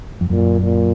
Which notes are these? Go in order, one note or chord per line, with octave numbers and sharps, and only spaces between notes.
F2
F#2 A#2
A#2